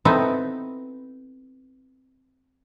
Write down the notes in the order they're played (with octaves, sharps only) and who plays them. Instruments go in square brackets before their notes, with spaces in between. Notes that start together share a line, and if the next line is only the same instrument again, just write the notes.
[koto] B3 C4 D#4 E4 A4